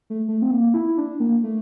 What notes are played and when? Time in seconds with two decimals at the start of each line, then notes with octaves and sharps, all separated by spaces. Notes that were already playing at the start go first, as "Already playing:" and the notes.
0.10 A3
0.28 A3
0.42 C4
0.51 A#3
0.74 E4
0.98 D4
1.20 A#3
1.43 A3